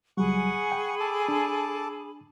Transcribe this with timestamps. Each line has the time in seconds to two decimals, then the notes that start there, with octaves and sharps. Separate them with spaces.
0.17 C#2 F#3 G3 G#4 F#5 G#5 B5 C#6
0.72 G5
1.00 A4 A5 D6
1.28 D4